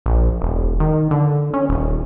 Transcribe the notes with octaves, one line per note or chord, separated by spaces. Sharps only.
A#1
E1
D#3
D3
C#4
D#1